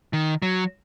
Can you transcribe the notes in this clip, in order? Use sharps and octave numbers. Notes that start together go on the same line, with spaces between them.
D#3
F#3